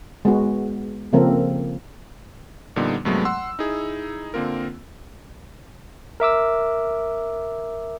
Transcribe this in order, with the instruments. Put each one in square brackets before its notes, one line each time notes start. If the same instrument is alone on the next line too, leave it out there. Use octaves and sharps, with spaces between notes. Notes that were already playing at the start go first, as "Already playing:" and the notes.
[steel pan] G#3 B3 F#4
C#3 F3 A#3 C4 A4 A#4
[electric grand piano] F2 A#2 D3 G3 B3 D#4
G2 C3 F#3 G#3 A3 B3
F#5 C6 E6
D#4 E4 G#4
D3 A#3 C4 F4 A#4
[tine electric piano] A#4 E5 D6 E6